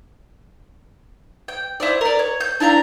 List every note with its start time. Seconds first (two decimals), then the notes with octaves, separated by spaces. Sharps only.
1.48 G5
1.80 E4 C5 D5
2.01 A#4 D5
2.19 C#5
2.40 G6
2.60 D4 E4 F5 A#5